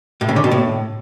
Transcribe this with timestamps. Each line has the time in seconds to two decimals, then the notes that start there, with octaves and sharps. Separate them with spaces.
0.21 A2
0.29 C#3
0.36 D3
0.44 B2
0.51 A2